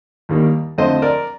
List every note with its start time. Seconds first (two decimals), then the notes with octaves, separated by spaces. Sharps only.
0.29 D#2 D#3 G3 A#3
0.78 F2 D3 A3 C4 C5 D#5
1.02 A#4 D5